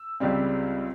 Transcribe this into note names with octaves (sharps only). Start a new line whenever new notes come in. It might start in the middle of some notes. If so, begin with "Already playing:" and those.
Already playing: E6
C#2 C#3 G3 C4